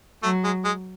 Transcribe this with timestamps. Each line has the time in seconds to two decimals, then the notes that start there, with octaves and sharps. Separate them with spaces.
0.23 F#3 A3
0.44 G#3
0.65 G#3